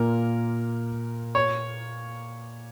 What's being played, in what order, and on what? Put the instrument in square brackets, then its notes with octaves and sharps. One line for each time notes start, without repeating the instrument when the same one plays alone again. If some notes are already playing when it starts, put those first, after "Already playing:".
Already playing: [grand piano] A#2 A#3 F4 [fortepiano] A#4
[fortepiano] C#5